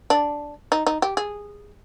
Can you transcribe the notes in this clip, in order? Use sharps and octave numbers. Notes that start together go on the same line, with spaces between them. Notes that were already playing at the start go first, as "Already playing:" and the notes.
D4
D#4
D#4
G4
G#4